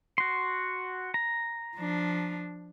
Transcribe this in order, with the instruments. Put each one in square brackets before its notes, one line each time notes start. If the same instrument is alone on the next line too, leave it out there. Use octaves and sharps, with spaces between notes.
[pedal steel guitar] F#4 C6
A#5
[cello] F3 D4